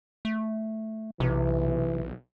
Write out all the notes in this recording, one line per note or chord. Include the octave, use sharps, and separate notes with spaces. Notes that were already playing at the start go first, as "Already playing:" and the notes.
A3
B1 C3 E3